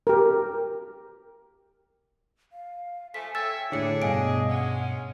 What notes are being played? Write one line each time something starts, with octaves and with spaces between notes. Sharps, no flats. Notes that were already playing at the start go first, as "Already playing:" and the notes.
G4 A#4
F5
F3 A3 G#5 B6
C#5 E5 G5 E6 A6
A2 D3 D4 E4 G#4 C#5 C#7
G2 B2 D#5 F5 G#5 D7
G#3 C#4 F#5